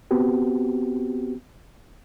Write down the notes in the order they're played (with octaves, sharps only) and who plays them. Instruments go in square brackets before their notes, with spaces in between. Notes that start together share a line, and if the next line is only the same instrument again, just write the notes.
[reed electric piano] B3 C4 F#4 G4